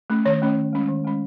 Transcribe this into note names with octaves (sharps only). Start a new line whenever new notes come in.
A3 C#4
D#3 C#5
A3 C#4
D#3
G#3 C#4
D#3
G#3 C#4